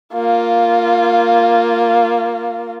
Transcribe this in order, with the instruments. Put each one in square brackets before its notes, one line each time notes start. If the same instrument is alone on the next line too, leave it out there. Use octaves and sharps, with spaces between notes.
[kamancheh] A#3 F4